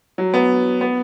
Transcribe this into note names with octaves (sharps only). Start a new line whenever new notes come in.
F#3
B3
B3